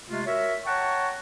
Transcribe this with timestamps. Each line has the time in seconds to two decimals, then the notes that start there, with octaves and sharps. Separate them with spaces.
0.09 C3 G#3 A3 F4
0.26 F#4 A#4 C#5 E5
0.65 C#5 F#5 G5 A5 A#5 C#6